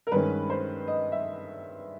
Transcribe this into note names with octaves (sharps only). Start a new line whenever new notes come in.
A#4
G2 D#3 G#3 C#4 B4
C5
D#5
E5